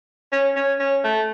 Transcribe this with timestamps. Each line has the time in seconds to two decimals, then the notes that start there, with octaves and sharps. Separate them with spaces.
0.32 C#4
0.56 C#4
0.80 C#4
1.04 A3